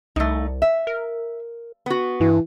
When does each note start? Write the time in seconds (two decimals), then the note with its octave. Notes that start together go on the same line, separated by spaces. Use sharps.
0.16 C2 A3 D#4
0.62 E5
0.87 A#4
1.86 B3 F#4
2.20 G2 E3